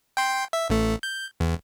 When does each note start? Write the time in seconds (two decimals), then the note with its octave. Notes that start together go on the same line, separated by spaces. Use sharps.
0.17 G5 C6
0.53 E5
0.70 A1 A3
1.03 G6
1.40 E2